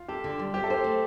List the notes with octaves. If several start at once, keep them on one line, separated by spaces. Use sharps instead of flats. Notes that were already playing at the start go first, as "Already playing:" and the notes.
Already playing: F4
G4 A4
D3
G3
G4 C5
A4
G4 C5
A3